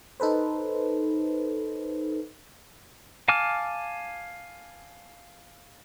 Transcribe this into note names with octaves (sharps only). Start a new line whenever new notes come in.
D#4 A4 B4 C5
F5 G#5 A5 D6 F6